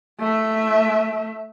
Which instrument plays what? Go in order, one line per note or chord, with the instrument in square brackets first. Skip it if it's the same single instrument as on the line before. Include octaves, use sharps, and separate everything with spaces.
[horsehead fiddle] A3 E5